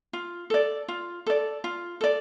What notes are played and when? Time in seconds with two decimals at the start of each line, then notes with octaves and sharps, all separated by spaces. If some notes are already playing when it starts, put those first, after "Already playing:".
0.13 F4
0.50 A4 D5
0.88 F4
1.27 A4 D5
1.64 F4
2.01 A4 D5